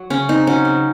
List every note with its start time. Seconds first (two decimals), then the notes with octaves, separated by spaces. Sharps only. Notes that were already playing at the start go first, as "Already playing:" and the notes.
Already playing: F#3
0.10 C#3 C#4
0.29 C4 D#4
0.47 F#3 C#4
0.65 C#3